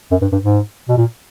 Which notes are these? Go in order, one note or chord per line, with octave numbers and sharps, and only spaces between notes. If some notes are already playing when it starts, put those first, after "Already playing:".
F#2
G2
G2
G#2
B2
A#2